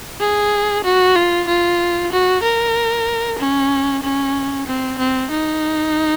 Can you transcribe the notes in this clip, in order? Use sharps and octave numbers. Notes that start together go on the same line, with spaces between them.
G#4
F#4
F4
F4
F#4
A#4
C#4
C#4
C4
C4
D#4